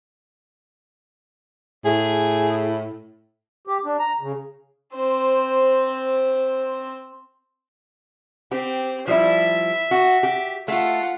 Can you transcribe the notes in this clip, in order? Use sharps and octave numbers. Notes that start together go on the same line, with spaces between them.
A2 G#4
G4
D4
A#5
C#3
C4 C5
C4 G4
F3 G3 E4 E5
F#4
G4
A3 F4 A4 F#5